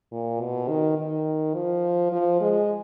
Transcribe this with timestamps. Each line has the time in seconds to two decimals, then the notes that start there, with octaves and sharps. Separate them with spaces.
0.12 A#2
0.40 B2
0.69 D#3
0.98 D#3
1.55 F3
2.12 F3
2.41 G#3